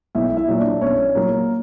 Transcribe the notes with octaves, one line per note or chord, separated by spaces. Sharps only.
B1 E4 E5
E4 E5
A#2 F#3
D4 D5
B1 C#4 C#5
A#2 F#3 A#3 A#4